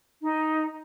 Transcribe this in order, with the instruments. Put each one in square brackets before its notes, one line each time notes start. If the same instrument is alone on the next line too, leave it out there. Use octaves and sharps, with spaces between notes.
[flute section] D#4